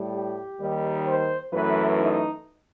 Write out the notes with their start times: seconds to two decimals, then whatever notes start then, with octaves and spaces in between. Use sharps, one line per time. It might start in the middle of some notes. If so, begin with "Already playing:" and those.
Already playing: A2 G3
0.13 G4
0.59 D#2 D#3 G3
1.05 C5
1.52 F#2 E3 A3 B4
1.98 D#4